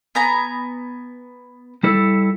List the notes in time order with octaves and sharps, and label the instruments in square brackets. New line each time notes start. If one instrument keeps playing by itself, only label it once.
[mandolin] B3 G#5 A#5
[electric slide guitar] G3 E4 A4